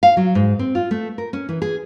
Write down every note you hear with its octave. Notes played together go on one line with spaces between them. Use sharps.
F5
F#3
G#2
C4
F4
A3
A#4
C#4
E3
G#4